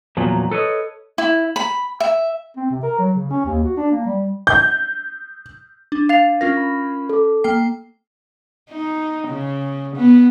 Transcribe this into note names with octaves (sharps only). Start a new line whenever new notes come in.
E2 A#2 F3 F#3
A4 B4 C#5 D#5
E4
B5
E5
C4
C3
A#4
F#3
C#3
C#4
D#2
F#4
D4
A#3
G3
G6
D4
F5 A6 F7
C#4 F4 A#4 A#6
B5
A4 D6
A#3 G5 C7
D#4
C#3
B3